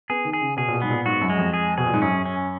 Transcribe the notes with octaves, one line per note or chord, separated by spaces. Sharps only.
B3 G#4
D#3
G#4
C#3
B2 G#4
A#2
B2
G#2 B3
A#2
G#2 F#4
F#2
G#3
F2
G#4
B2 G#4
A#2
G#2
F#2 C#4
C#4